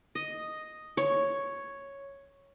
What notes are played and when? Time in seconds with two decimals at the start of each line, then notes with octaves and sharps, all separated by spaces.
0.15 D#5
0.97 C#5